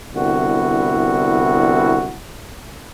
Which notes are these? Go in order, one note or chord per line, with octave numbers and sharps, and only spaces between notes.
C2 D3 B3 E4 F#4